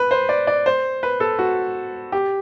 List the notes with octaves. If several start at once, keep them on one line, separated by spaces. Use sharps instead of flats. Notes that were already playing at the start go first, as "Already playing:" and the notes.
Already playing: B4
C5
D5
D5
C5
B4
A4
F#4
G4